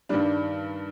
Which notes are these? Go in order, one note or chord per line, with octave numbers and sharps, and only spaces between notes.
G2 D#3 G3 D4